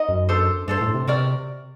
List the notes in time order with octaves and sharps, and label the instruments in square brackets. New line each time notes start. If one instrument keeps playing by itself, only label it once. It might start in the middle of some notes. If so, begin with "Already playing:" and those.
Already playing: [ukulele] D#4 D#5
[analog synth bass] F#2
[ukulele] D4 A4 C5
[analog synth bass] G2 [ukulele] D4 A4 C5
[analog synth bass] A2
C3
[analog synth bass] C3 [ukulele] F#4 A#4 D5